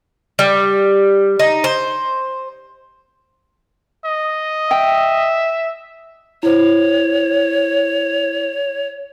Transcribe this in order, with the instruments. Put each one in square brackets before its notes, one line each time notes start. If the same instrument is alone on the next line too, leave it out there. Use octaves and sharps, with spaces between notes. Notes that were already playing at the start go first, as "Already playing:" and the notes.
[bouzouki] G3
D#4
C5
[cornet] D#5
[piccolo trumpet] E5 [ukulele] G5
[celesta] E4 C5 [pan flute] C#5